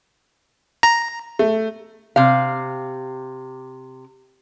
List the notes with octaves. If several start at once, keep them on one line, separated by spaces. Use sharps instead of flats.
A#5
A3
C3 F5